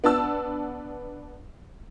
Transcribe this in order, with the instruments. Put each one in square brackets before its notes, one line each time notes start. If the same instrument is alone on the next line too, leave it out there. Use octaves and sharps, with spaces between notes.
[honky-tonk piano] B3 D4 A5 E6